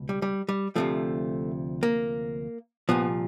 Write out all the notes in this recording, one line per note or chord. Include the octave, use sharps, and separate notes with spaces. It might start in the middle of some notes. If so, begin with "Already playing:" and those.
Already playing: C#2 B2
G3
G3
G3
D2 C3 F3 A3
A#3
C2 A#2 F3 B3